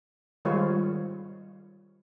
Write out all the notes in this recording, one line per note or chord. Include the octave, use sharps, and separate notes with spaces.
D#3 G3 G#3 F4 C5 C#5